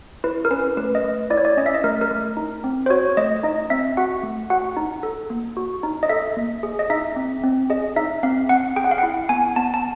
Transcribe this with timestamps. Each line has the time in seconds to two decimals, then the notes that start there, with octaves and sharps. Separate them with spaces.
0.24 E4 B4
0.45 A#4
0.51 C#4 B4
0.77 A3 B4
0.95 D#5
1.04 A3
1.30 E4 D5
1.38 C#5
1.45 D5
1.57 C#4 D#5
1.66 E5
1.74 D#5
1.84 A3 A#4
2.01 A#4
2.10 A3
2.37 D#4
2.64 C4
2.86 C5
2.90 F#4 C#5
3.17 A3 D#5
3.43 D#4 D#5
3.70 C4 E5
3.97 F#4 F#5
4.23 A3
4.50 F#4 F#5
4.77 D#4
5.03 A4
5.30 A#3
5.57 F#4
5.83 D#4
6.03 D#5
6.09 A4 E5
6.37 A#3
6.63 G#4
6.79 D#5
6.90 D#4 E5
7.16 C4
7.43 C4
7.70 G#4 D#5
7.96 D#4 E5
8.23 C4 F5
8.49 C4 F#5
8.76 G#4 G5
8.84 F#5
8.91 F5
8.98 F#5
9.03 E4
9.29 B3 G#5
9.56 B3 A5
9.74 A5